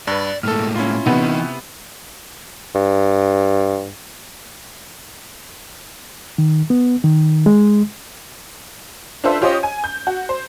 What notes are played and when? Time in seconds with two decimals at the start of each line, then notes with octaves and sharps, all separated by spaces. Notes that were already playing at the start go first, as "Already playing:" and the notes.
0.07 G2 B4 D5
0.43 A2 G#3 A#3 A4 F6
0.76 C#4 E4 F4
1.06 C3 E3 B3 D#4
2.75 G2
6.38 D#3
6.70 B3
7.04 D#3
7.46 G#3
9.24 D4 F4 A4 B4 C5 E5
9.41 C#4 F4 G4 C5 C#5 D#5
9.63 G#5
9.84 G6
10.07 F#4
10.29 C5